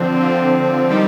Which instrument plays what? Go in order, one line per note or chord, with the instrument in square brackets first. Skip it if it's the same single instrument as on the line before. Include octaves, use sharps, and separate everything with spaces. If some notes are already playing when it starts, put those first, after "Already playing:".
Already playing: [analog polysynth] D3 F3 C4
D3 F3 C4
D#3 G3 C4 G4